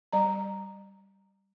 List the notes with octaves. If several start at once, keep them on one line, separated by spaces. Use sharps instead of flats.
G3 A#5